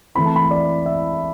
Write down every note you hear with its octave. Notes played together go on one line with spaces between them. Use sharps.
E3 A3 C4 E4 B5
A5
B5
D5
E5